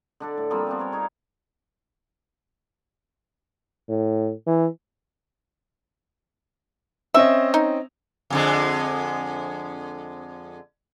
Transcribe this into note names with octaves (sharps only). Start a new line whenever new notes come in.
D3 D4 A4
A2
F3 G3 A#3 C4
B3 C4 D4
A#4 C#5
D#4 A#4 C#5 F5
A2
E3
C4 C#4 D#5 E5
D#4
F2 D3 G#3